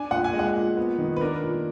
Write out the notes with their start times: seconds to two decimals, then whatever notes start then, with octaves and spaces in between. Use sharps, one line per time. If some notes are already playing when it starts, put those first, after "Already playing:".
Already playing: D4 G#5
0.11 A#2 F#5
0.24 G#5
0.33 G#3
0.39 F#5
0.56 A#2
0.77 B3
0.98 D#3
1.17 B4
1.21 D4 A#4
1.43 A#2